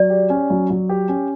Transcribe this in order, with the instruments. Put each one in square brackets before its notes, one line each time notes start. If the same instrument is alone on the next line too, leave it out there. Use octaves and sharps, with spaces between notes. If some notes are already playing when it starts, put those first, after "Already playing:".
Already playing: [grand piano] F#3 [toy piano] D5
[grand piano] G4
C#4
F#3
F#3
G4
C#4